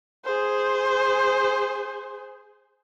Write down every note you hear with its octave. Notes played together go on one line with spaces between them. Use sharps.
G#4 C5